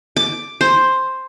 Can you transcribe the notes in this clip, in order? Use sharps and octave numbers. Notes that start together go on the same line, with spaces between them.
D6
C5